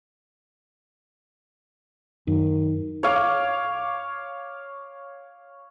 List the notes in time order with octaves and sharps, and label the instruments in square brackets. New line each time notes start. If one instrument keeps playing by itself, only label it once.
[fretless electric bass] F#2 [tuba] D#3
[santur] C#5 F5 D6